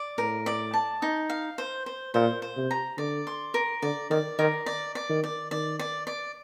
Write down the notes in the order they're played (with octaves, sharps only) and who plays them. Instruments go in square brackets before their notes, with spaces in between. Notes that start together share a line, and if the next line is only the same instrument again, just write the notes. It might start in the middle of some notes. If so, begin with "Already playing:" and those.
Already playing: [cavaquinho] D5
[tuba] A2 [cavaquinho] A#4
[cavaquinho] D5
A5
D#4
F5
C5
C5
[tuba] A#2 [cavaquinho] C5
[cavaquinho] C5
[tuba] C3
[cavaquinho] A#5
[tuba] D3 [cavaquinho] D5
[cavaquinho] C6
A#4
[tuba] D3 [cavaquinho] D5
[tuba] D#3 [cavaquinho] D5
[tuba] D#3 [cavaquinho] A#4
[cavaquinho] D5
D5
[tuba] D#3
[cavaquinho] D5
[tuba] D#3 [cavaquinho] D5
[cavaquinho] D5
D5